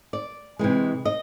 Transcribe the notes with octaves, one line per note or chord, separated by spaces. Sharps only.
D5
C3 E3 G#3
D#5